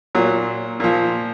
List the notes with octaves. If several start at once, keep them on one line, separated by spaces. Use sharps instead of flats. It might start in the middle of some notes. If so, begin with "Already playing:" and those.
A#2 F#3
A#2 F3